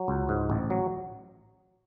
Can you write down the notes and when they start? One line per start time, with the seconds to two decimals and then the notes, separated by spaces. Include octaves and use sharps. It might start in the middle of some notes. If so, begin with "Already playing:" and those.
Already playing: F#3
0.08 C#2
0.29 G#2
0.50 A1
0.70 F#3